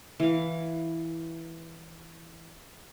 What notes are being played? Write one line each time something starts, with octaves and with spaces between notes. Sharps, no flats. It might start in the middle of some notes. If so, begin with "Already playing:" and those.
E3 F5